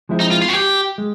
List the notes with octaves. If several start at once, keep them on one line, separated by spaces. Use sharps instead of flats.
F3 G#3 C4 E4
D#4
F4
F4
F#4
G4
G#3